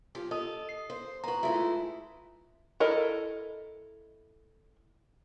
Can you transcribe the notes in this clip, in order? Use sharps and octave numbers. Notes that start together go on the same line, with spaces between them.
F3 G4
A4 D#5 D#6
C7
C5
B3 F#4 A#5
G#3 A3 E4 F4 E5
E4 A4 A#4 D#5